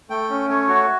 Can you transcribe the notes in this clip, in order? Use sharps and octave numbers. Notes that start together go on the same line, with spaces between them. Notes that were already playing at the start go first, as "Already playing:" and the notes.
A3 G5
C#4
A3 C#5
F#4